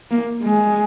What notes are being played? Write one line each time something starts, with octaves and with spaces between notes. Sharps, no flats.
A#3
G#3